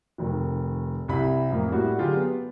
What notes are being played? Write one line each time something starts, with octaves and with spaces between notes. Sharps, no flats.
F1 D#3
C2 C3 E4 B5
F2 A2 A#3
A2 G3 E4 F#4
D3 F#3 F4 G4 G#4
B3